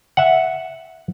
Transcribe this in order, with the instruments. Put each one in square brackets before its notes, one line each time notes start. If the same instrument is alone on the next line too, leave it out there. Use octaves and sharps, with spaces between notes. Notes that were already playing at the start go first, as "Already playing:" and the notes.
[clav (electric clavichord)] E5 F#5